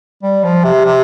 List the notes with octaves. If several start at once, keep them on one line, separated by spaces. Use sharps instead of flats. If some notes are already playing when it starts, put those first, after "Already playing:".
G3
F3
C3
C3